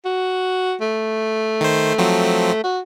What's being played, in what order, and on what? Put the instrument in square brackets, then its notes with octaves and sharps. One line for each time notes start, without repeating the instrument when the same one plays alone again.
[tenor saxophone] F#4
A3
[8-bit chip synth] D#3 C5
F3 F#3 C4
[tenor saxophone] F#4